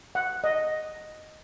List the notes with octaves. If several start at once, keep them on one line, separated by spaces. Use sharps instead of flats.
F#5
D#5